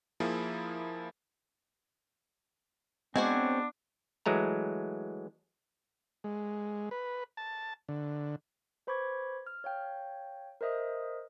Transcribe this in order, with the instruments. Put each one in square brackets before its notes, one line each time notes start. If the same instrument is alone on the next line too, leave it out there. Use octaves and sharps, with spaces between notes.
[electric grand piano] F3 A#3 E4 G#4
[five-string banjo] G#3 F#4 C5 [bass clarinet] B3 [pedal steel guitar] C4 C#5 [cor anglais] D4
[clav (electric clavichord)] E3 F#3 G#3 A3 A#5
[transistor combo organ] G#3
B4
A5
D3
[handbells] B4 C5 B5 C#6 D6 G#6
F6
C#5 F5 G5
A#4 C5 D#5 E5 D#6